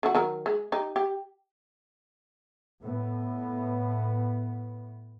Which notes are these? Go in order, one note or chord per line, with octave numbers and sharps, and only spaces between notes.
D3 F#4
D#3 F#3 A#4
G#3
D#4 G4
G4
A2 B3